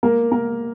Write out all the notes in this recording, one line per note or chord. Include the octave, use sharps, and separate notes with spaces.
A#3 A#4
A#3 A#4